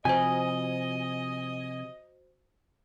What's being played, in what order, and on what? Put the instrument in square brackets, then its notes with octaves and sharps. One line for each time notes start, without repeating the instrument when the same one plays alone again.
[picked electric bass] C3 F3 [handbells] F#4 C5 [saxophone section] D#5 [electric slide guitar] G#5